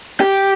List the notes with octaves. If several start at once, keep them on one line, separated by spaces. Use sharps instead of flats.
G4